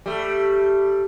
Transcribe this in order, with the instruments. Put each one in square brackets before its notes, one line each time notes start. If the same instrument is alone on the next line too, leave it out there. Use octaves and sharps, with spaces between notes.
[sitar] G3 A3